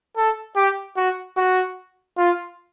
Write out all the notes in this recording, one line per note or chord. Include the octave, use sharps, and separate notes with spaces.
A4
G4
F#4
F#4
F4